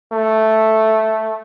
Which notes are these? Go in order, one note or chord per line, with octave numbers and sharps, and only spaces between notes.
A3